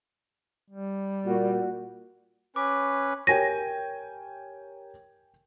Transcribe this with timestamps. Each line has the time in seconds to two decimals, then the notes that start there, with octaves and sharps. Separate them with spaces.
0.70 G3
1.26 A#2 F#4
2.56 C#4 B4 D6
3.27 G4 A#4 C#5 G5 G#5 A#6 D#7